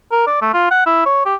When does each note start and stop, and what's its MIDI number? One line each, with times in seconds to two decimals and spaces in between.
0.12 0.24 70
0.27 0.38 74
0.41 0.52 57
0.54 0.68 65
0.71 0.83 78
0.86 1.05 64
1.06 1.25 73
1.26 1.35 67